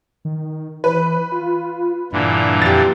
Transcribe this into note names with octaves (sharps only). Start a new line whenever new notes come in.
D#3
E3 B4
F4
G2 A#2 D3 E3
F2 G4 A6